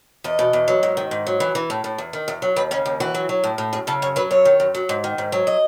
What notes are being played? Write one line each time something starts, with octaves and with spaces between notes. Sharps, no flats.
E2 D#5
B2
E2
F#3
G#2
D#3
G#2
F#3
E3
E3
A2
A2
E2
D#3
E2
F#3
D#2 B4
C#3 C#4
D#2
E3 F#4
F#3
F#3
A2
A2
F#2 G#4
C#3 A4
F#2 C#5
F#3 B4
F#2 C#5
D#3
F#2
F#3
G#2
D#3
G#2
F#3
D#5